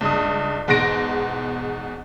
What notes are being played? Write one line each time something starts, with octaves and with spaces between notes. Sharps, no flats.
C#2 G2 D#6
E2 G#2 B2 C6 A#6 D7